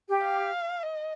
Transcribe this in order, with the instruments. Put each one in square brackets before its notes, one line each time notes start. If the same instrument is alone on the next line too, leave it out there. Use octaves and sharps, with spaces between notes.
[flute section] G4
[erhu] F5
D#5